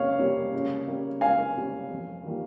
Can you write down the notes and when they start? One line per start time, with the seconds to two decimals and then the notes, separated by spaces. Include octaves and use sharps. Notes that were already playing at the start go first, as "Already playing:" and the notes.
Already playing: C#2 C3 G3 A#3 C#4 C#5 F5
0.19 C3 G3 A#3 C#4
0.53 C#2
0.87 C3 G3 A#3 C#4
1.21 C#2 F5 G#5
1.56 C3 G3 A#3 C#4
1.90 F2
2.24 D#3 G3 A#3 F4